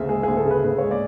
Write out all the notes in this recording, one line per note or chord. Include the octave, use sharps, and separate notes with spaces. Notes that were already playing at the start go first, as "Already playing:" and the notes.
Already playing: D2 C#3 E5
G#3 G#4
D2 G#4
A4
C#3
B4
D2 B4
G#3 C#5
D5